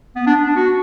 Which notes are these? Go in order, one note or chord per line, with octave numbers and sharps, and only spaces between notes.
B3
D4
D4
F#4